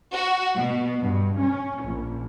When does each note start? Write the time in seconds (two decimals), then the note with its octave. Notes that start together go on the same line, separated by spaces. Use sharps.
0.12 F#4
0.57 B2
1.01 G2
1.37 C#4
1.84 A#1